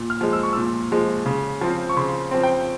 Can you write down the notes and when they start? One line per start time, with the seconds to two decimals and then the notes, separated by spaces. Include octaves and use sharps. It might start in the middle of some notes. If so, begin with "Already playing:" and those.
Already playing: A#2
0.10 F6
0.21 F3 G#3
0.33 E6
0.43 C#6
0.53 A#2 E6
0.92 F3 G#3
1.26 C#3
1.61 F3 C4
1.89 C#6
1.96 C#3 C6
2.31 F3 C4
2.43 G5